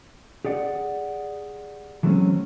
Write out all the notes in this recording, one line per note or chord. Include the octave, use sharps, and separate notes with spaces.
G4 G#4 D5 F#5
E3 F#3 G#3 A3 C4 C#4